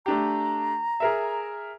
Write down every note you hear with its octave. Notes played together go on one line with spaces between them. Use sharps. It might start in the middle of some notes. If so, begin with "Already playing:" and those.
A3 D4 G4 A#5
G#4 A#4 E5